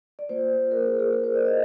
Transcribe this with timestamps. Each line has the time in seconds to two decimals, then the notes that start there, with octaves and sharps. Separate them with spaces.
0.19 D5
0.29 A#3 F4 C5
0.71 A#4
0.86 G#4
0.99 G#4
1.14 A#4
1.24 C5
1.34 D5
1.45 D#5